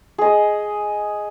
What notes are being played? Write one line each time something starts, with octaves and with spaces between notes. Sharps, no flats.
G#4 D#5